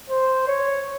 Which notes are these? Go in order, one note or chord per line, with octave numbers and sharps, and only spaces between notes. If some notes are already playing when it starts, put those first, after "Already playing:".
C5
C#5